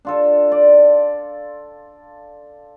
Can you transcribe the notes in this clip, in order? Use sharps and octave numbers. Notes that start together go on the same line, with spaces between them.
D4 F4 A4
D5